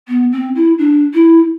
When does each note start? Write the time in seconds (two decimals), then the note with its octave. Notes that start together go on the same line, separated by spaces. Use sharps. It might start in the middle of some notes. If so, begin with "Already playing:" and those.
0.08 B3
0.32 C4
0.55 E4
0.78 D4
1.13 E4